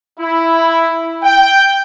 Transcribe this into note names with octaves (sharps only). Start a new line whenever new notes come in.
E4
G5